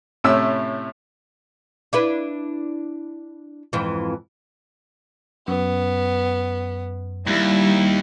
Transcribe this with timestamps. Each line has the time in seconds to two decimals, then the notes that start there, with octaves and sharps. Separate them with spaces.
0.24 A2 C3 A3 C#4 E4 E6
1.93 D4 E4 B4
3.73 F2 G#2 E3
5.48 F#2 B3
7.27 D#2 G3 E4